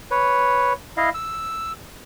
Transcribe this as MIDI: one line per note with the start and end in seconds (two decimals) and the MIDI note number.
0.11 0.73 71
0.11 0.73 73
0.97 1.10 64
0.97 1.10 75
0.97 1.10 77
1.15 1.72 88